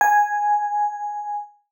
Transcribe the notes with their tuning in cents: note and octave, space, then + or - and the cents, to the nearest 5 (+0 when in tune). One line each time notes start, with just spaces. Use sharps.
G#5 -5